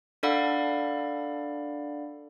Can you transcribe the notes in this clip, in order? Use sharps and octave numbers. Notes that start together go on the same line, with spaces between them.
D4 A4 D5 F5 F#5 B5